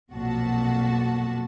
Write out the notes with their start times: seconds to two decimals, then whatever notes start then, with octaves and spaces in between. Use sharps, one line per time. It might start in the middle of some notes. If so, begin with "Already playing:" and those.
0.11 B1 F2 A#2 F#4 A5